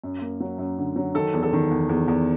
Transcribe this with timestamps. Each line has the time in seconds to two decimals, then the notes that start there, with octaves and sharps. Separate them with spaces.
0.04 F#2
0.21 A#3
0.40 F#3
0.58 F#2
0.78 D3
0.96 F#3
1.14 D#3 A4
1.33 E2
1.43 A4
1.53 D#3
1.71 E2
1.89 E2
2.08 E2